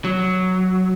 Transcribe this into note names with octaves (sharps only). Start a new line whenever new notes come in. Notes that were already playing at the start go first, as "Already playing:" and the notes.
F#3